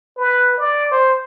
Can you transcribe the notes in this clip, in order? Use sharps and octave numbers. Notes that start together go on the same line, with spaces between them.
B4
D5
C5